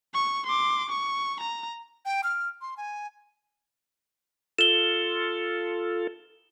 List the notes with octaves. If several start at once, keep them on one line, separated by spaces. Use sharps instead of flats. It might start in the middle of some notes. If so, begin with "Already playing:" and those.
C#6
C6 D6
C#6
A#5
G5
F6
C6
G#5
F4 A4 E7 G7